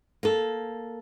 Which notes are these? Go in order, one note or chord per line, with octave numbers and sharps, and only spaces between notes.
A#3 A4